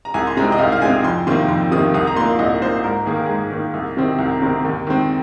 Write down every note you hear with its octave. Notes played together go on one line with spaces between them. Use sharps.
A#5
C2 G#5
C6
C3 G#3 C4 A#5
D#5
C2 F5
F5
C3 G#3 C4 G#5
F2 C6
C3 D#3 A#3 C6
F2 C6
C3 D#3 A#3 D#6
C2 D#6
A#5
A#2 A#3 C6
C2 D#5
A#2 A#3 C5
G#2 A#4
D#3 A#3 G#4
A#4
G#2 G#4
D#3 A#3
C2
C3 D#3 C4
C2 A#4
C3 D#3 C4 A#4
D#2
D#3 G#3 C4